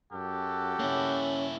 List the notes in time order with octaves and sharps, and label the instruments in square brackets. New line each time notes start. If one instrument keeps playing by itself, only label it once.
[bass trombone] F#2 [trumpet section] F#4 G4 A4
[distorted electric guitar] A#3 E4 [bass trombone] C#4